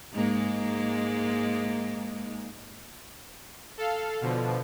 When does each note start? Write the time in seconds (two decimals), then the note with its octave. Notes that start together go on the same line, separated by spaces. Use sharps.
0.14 G#2 G#3 A#3
3.78 A4 F5
4.21 B2 D3 F3